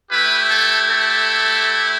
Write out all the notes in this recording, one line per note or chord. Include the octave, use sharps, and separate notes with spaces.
A3 E4 G4 B4
A4
A4